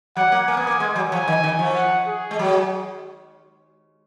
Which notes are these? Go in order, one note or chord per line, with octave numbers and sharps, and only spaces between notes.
F#3 F#5
A#3
A#3 G#5
B3
A#3
G#3
F#3
F3 G#5
D#3
D#3
F3
F#5
G#4
G#3
F#3